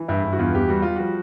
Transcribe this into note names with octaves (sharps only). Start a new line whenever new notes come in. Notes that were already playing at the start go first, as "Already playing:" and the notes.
Already playing: E3
G2 E4
G2
F#4
E2 F4
E2 G4
G3 F#4
G3 F4
F3 F#4